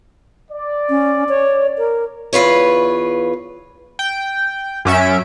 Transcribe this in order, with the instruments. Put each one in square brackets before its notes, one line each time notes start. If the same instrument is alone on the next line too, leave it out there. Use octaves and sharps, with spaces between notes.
[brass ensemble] D5
[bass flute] C#4
C#5
A#4
[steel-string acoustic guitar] E2 F4 B4 C#5
[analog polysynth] G5
F#2 C#4 E5 D7